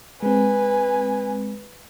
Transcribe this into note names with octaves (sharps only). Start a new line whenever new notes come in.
G#3 C4 B4 G#5